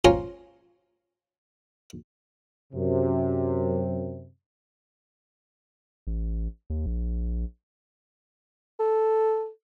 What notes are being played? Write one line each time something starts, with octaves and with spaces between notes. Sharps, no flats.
C#4 F4 C5 G#5 A#5
F#2 C3
A1
D#2
A#1
A4